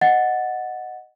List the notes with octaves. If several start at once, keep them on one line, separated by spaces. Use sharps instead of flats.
D#5 F#5 A6